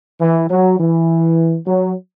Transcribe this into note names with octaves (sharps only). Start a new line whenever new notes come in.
E3
F#3
E3
F#3